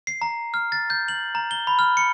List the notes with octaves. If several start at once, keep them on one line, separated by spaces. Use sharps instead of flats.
C7
A#5
F6
A6
G6
F#7
A#5
G7
B5
F6
C#7